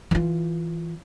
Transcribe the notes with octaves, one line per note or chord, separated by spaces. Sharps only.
E3 F4